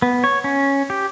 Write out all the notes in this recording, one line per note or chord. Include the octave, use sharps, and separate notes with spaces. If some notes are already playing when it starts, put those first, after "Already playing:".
B3
C#5
C#4
G4